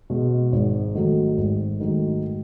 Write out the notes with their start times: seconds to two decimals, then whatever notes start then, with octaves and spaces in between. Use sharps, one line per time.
0.10 B2 G#3
0.52 G#1
0.95 G#2 D#3 F#3 A3
1.37 G#1
1.80 G#2 D#3 F#3 A3